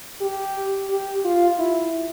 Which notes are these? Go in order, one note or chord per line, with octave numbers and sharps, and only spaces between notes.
G4
G4
F4
E4